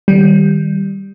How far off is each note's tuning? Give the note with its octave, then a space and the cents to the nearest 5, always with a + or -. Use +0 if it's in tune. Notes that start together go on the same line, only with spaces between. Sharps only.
D#3 +0 G3 +0